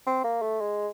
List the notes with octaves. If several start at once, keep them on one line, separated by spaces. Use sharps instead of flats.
C4
A#3
A3
G#3